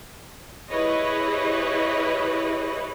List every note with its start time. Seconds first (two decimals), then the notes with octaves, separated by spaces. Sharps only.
0.71 E4 G4 G#4 B4 C#5 D#5